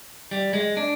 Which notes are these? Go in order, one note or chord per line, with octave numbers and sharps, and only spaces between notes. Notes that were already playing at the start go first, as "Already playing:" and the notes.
G3
G#3
D4